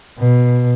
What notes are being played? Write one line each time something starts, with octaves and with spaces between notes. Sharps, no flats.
B2